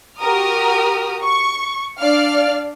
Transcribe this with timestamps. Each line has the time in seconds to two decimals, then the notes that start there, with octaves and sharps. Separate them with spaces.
0.19 F#4 G4 A#4 D#6 F6
1.22 C#6
2.00 D4 D5 F5 F6